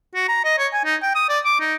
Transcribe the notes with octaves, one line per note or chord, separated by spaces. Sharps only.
F#4
A#5
D#5
C#5
G#5
D#4
G5
D#6
D5
D6
D#4